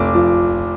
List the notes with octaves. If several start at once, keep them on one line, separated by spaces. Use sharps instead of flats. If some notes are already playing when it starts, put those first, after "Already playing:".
Already playing: F1 D6
F3